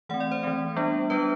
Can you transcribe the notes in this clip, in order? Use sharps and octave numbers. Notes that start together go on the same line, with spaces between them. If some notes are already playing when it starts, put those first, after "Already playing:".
E3 A3 C4 F#5
D5
C5
E3 A3 C4
G3 B3 D4
G3 B3 D4 B4